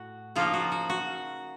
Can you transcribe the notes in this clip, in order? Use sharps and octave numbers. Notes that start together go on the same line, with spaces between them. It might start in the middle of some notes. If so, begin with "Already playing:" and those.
Already playing: A2 F#4
C#3 F3 A#3 D#4 F4
F#4
F#4
F#4